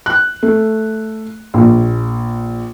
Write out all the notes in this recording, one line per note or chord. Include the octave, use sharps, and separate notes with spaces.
F#6
A3
A#1